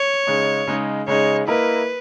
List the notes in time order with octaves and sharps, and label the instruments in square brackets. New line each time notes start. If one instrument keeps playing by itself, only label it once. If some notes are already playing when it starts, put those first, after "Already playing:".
Already playing: [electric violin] C#5
[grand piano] C#3 G#3 D#4
C#3 G#3 D#4
[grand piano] C#3 G#3 D#4 [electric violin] C#5
[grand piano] A#3 E4 A#4 D#5 [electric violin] B4